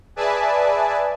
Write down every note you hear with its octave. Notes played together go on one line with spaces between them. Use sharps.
G#4 B4 D5 E5 G#5 A5